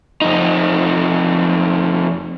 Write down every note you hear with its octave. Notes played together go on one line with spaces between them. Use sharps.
F2 D#4